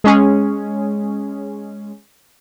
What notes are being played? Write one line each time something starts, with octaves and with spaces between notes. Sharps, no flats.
G#3 C#4 G#4